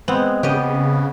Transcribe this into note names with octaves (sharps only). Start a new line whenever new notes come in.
G#3 B3 C4
C#3 B3 G4 D#5